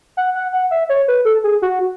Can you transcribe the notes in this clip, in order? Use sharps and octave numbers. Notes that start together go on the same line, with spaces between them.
F#5
F#5
F#5
E5
C#5
B4
A4
G#4
F#4